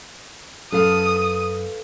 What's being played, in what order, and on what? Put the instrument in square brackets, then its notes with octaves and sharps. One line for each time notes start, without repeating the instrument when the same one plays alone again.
[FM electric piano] F#2 [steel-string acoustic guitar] A4 B4 F5 [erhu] D#6